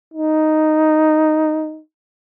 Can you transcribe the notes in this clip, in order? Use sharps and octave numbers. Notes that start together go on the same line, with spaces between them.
D#4